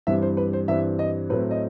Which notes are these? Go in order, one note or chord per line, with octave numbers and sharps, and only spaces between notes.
G2 E3 G3 C4 E5
C5
B4
C5
G2 E3 G3 C4 E5
D#5
A2 F#3 A3 C4 B4
D#5